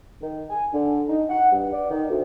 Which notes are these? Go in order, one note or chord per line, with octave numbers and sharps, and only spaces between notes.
D#3
G#5
D3
D#4
F#5
G2
D5
D#3
D2